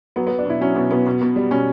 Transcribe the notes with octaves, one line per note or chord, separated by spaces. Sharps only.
F#3 B3
B3
F#3
D4
B2 E4
F#3 C#4
B2 B3
B2 B3
B2
B2
G3
B2 C#4